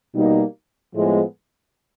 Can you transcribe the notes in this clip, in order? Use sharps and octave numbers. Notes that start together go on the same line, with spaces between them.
B2 G3 A#3 D#4
A2 F3 G#3 B3